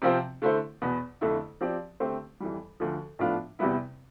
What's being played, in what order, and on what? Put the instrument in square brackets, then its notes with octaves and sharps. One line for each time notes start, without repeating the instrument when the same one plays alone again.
[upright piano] C3 F3 C4 F4 C5
D3 A3 E4 A4 C5
E2 B2 B3
F2 D3 A3 E4
F3 C4 G4 D5
D3 A3 C4 G4 C5
F2 E3 G3
D2 D3 F3
A2 F3 B3 D4 F4
E2 C3 G3 B3 E4